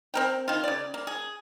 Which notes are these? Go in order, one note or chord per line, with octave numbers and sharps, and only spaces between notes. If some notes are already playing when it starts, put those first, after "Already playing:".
C4 A#4 G5
D#3 F4
C#3 D5
A#3
G#4